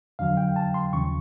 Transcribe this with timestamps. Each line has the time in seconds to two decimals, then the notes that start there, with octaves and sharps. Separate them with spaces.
0.19 F2 D3 F#3 F5
0.37 G5
0.56 A5
0.74 C6
0.93 D#2 C#3 F3 C#6